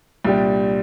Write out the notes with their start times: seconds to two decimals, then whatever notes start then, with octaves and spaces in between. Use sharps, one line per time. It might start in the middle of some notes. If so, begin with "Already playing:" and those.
0.25 C2 A#2 G3 D4 G4